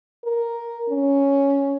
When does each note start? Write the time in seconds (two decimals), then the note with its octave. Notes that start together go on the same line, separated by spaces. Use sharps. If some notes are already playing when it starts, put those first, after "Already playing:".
0.24 A#4
0.89 C#4